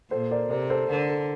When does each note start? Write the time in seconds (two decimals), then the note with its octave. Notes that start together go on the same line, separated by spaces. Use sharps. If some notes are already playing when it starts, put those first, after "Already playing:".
0.11 A#2 A4 C5
0.31 A#4 D5
0.50 C3 A#4 D5
0.70 A4 C5
0.90 D3 A#4
1.09 A4